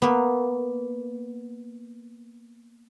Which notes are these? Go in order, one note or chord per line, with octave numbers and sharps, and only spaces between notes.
A#3 B3